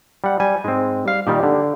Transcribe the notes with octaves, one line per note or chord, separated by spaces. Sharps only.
G3 F#5
G3 G#5
G#2 G#3 C4
G3 F5
A#2 D#3 G3 G4
D3